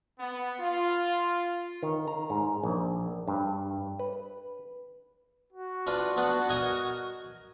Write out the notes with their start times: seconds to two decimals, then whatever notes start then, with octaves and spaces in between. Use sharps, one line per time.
0.19 B3
0.60 F4
1.83 D#3
2.08 A#5
2.30 G#2
2.64 A#1
3.28 G2
3.99 B4
5.53 F#4
5.87 D4 F4 B4
6.17 B3 D4 B4
6.49 A#4 D#5 G#5